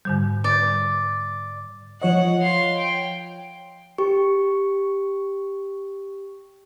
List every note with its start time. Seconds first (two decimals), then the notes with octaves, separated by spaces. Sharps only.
0.05 G#2 D3 G3
0.44 D5
2.02 F3 C#5 D#5 F#5
2.41 F5 C6
2.77 G5
3.98 G4 C#6